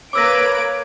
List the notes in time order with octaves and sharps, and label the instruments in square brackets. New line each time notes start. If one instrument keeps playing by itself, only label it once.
[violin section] A#3 B4 D7 [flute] C#5 [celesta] D6 E6 A#6